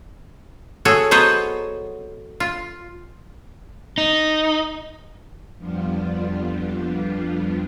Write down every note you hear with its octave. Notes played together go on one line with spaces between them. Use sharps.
F#4 G#4 A4 C#5
F#3 B3 C5 C#5 D#5
F4
D#4
F2 F3 G3 B3 D4 F4